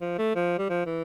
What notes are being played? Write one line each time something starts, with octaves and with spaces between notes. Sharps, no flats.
F3
A3
F3
G3
F3
E3